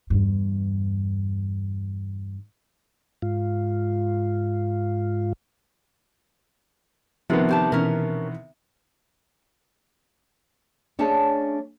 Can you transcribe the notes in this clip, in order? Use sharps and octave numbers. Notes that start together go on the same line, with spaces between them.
E2 G2
G#2 F4
A2 C3 D#3 F3 B3 B4
A2 G4 A5
B2 E3 C#4 A#4
A3 C#4 D4 G#4 C#5 A5